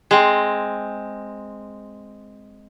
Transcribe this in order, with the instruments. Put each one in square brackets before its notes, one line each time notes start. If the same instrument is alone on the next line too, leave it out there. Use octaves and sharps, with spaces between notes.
[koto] G#3 C4